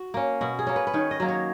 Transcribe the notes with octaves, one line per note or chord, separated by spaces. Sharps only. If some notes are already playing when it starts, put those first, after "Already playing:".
Already playing: F#4
A#3 C#4
B2 F#4
G#4
A#3 C#4
B4
B4
D#3 C#5
D#5
F#3 A#3
C#5